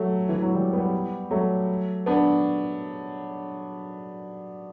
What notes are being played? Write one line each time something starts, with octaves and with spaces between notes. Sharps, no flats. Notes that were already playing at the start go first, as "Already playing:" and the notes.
Already playing: F#3 A3
E3
F#3
E3 G3
G3 B3
F#3 A3
B3 D4